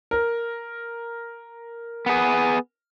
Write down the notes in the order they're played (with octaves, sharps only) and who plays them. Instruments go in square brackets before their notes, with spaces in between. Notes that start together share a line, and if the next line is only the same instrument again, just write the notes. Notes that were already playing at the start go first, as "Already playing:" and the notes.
[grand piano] A#4
[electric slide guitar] B3 G#4